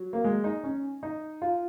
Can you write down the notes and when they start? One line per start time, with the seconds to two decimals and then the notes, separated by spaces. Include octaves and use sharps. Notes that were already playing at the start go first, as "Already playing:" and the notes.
Already playing: F#3
0.13 A#3
0.24 G#3
0.44 D#4
0.64 C#4
1.03 D#4
1.42 F4